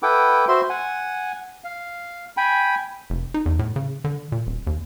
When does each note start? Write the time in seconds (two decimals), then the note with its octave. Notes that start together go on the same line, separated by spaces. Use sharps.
0.03 E4 A4 B4 F#5 G5 D6
0.48 F#4 C5 E5 C6
0.69 F#5 G#5
1.64 F5
2.37 G5 G#5 B5
3.10 F1
3.34 D#4
3.46 E2
3.59 A2
3.76 C#3
4.04 D3
4.32 A#2
4.47 D#1
4.67 D#2